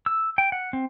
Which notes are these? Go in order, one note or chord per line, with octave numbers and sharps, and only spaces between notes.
E6
G5
F#5
C4